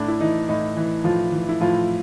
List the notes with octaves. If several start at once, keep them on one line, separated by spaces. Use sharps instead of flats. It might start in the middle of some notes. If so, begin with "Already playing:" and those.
Already playing: A2 D4
E4
E3 D#4
A2 D#4
E3
A2 F3 F4
E3
E4
A2 F3 F4